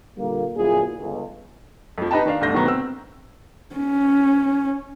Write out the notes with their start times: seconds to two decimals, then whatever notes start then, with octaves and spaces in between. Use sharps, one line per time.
0.18 A#2 D3 G3 A#3
0.57 G1 F#2 A#2 E4 F4 G#4
0.98 G1 C#2
1.98 F2 F3
2.11 D#4 G4 B4 D#5 G5 A5
2.26 D#3 D4 F5
2.41 G1 C2 D3 A3 G6 A#6
2.53 B2 D3 D#3 F#3 A3 B3
2.66 C4 E6
3.75 C#4